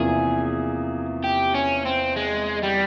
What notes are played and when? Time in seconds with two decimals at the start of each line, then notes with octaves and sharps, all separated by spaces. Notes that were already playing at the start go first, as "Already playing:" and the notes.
Already playing: E2 C3 F3 A#3 E4 G#4
1.24 G4
1.54 C#4
1.86 C4
2.16 G#3
2.63 G3